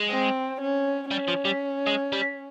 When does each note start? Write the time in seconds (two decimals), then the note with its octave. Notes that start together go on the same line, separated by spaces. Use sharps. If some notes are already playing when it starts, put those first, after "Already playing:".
Already playing: G#3
0.11 C4
0.61 C#4
1.11 G3 C#4
1.28 F3
1.45 G3
1.87 G#3
2.13 G3